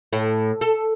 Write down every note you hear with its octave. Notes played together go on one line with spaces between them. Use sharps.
A2
A4